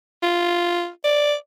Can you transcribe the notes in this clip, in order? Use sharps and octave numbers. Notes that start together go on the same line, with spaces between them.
F4
D5